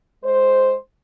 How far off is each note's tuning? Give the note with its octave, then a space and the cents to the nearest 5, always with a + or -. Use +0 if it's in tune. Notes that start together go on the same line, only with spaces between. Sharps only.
G#3 +0 C5 +0